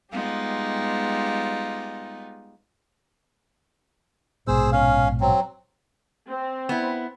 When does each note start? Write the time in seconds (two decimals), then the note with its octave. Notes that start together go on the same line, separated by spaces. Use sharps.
0.13 G3 G#3 B3 D#4 F4 G4
4.47 A#1 G#2 B2 G#4 C5 E6
4.72 C#4 F5
5.21 F#3 C4
6.28 C4
6.69 B3 E4